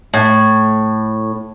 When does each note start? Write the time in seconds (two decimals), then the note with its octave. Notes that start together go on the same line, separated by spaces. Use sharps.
0.14 A2